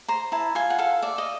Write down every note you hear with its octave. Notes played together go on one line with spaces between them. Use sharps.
C5 A#5
E4 A5
F4 G#5
F#5
A4 F5
D5 E5
D#5